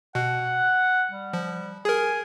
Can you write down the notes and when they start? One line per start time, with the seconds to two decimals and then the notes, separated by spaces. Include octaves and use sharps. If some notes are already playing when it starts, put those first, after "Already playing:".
0.15 B2 F#5
1.11 G3
1.33 F3
1.85 G#4 A#4 G#5